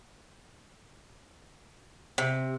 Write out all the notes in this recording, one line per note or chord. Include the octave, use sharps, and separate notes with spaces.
C3